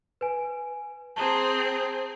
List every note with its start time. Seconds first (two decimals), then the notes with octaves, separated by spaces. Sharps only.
0.21 B4 G#5
1.16 C4 G#4 A5 A#5